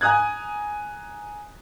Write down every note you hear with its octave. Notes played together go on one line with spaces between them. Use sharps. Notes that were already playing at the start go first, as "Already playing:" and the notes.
G#5 A#5 D#6 F#6 G#6